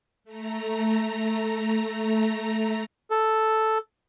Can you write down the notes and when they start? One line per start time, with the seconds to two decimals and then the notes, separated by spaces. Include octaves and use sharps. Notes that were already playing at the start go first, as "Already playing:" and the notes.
0.24 A3 A#5
3.11 A4